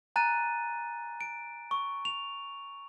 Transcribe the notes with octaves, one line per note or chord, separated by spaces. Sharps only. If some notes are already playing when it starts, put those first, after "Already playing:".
G#5 A#5 F#6 A6 D#7
D7
C#6
F7